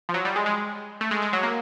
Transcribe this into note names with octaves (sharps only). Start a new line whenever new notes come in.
F3
F#3
G3
G#3
G#3
A3
G#3
G#3
F#3
A#3